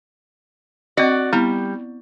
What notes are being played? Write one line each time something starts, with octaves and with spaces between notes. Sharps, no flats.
C4 F#4 D5 D#5
G3 B3 E4